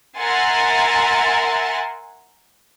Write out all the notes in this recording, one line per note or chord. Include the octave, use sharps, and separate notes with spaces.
A#4 E5 F#5 G#5 C6 A6